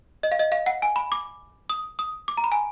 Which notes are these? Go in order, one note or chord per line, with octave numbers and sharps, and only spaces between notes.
D#5
F5
D#5
F5
F#5
G#5
B5
D6
D#6
D#6
D6
A#5
B5
G#5